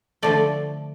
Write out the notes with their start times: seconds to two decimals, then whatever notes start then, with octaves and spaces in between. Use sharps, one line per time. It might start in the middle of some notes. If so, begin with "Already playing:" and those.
0.22 D3 F3 A3 D5